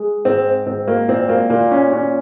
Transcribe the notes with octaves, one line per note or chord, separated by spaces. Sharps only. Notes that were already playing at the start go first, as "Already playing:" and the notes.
Already playing: G#3
G#2 C4
G#2 C4
A#3
A#2 C4
A#3
A#2 A#3
C#4
A#2 C#4